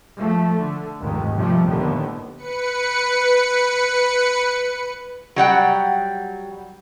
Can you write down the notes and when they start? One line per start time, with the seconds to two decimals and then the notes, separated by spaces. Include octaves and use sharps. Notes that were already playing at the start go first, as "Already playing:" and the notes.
0.20 F3 A3
0.59 D3
1.00 F1 D#2 G#2 D#3
1.36 C3 F3 G3 A3
1.66 D#2 A2 D3 B3
2.37 B4 C#7
5.36 F#3 G3 F#5 G5